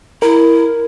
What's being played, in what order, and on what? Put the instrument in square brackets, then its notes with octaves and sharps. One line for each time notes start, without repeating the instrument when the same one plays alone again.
[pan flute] E4 [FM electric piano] A#4